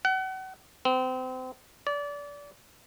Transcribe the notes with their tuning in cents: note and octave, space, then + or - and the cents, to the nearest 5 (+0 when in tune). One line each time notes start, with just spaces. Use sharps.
F#5 +35
C4 -30
D5 -25